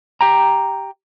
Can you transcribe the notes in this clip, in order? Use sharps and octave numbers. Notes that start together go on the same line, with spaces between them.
G4 G5 A#5